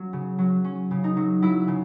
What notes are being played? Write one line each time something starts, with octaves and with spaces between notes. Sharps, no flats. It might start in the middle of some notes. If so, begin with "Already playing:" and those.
Already playing: F#3 C#4
C#3
F#3
C#4
C#3
D#4
F#3
F#3 E4
C#3